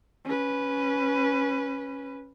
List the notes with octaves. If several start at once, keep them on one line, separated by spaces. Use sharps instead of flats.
C#4 B4